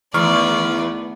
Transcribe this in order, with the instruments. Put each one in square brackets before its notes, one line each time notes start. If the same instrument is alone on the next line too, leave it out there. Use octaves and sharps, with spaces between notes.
[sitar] E2 [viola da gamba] D#3 A3 B3 [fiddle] D5 [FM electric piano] C#6 D6 F6